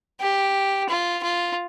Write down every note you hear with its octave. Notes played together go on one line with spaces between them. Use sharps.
G4
F4
F4